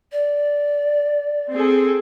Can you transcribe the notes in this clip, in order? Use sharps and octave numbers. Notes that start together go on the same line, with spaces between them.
D5
C4 G#4 A4